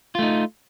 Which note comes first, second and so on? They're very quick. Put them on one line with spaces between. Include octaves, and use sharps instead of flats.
F4 A3 D#4